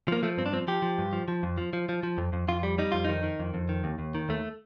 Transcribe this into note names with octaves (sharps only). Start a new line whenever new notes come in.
F3 A#3
F3 A3
G2 C4
D4
F3 C4
F3 G4
F3
G2
F3
F3
F2
F3
F3
F3
F3
F2
F2
F2 F4
G3
G3 D#4
F2 F4
D#3 D#4
D#3
F2
F2
D#3
D#2
D#2
D#3
D#2 A3